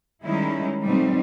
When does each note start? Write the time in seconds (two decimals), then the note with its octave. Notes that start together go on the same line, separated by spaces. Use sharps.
0.24 D#3 G3 G#3 C#4 D#4 E4
0.84 B2 F#3 G3 A3 C4 D#4